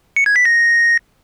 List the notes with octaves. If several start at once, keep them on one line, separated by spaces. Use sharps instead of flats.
C#7
G#6
B6
A#6